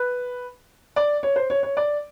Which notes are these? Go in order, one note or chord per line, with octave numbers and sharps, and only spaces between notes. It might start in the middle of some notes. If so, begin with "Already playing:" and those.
Already playing: B4
D5
C#5
C5
C#5
C#5
D5